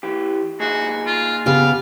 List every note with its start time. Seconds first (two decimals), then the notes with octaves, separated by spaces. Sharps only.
0.03 E3 G4
0.60 A#2 D#4 F#4 G#4
1.06 F4
1.46 C#3 B3 G4 F5